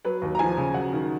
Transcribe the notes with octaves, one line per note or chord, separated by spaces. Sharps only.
F#3 B4
D#2
A#5
F3 G#5
C#3
F#3 F#5
D#3